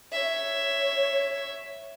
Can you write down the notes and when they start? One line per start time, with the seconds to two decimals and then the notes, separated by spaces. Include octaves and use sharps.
0.13 C#5 E5